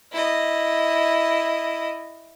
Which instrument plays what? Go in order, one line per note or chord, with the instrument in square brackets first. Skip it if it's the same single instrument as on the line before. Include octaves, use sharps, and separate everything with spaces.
[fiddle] E4 D#5